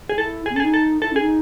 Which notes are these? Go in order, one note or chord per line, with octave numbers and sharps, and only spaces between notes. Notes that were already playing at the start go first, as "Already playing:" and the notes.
G#4
E4 A4
G#4
B3
C#4 A4
G#4
D#4
A4
E4 A4
C#4
G#4
D#4